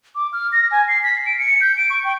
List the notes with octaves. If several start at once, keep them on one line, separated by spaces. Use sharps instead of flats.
D6
F6
A#6
G#5
C7
B6
D7
C#7
G6
D7
C#6
G5